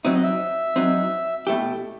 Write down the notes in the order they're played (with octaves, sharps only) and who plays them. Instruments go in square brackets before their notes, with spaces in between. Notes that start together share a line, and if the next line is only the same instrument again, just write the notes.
[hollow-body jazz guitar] F#3 C4 D#4 [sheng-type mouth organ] E5
[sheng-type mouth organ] D#5
E5
[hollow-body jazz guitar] F#3 C4 D#4
B2 A3 E4 G4